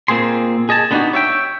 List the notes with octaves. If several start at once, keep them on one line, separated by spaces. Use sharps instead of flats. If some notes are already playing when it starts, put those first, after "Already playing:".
A#2 A#3 C4 G#4 C6
G#4 D#5 G#5 A5
D3 B3 D4 D#4 F#4 G4
C#5 E5 G5